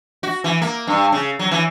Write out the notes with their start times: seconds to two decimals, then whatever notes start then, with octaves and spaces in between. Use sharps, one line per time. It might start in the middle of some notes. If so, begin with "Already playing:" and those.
0.23 F#4
0.44 E3
0.62 A#3
0.87 G2
1.12 C#3
1.39 F#3
1.51 E3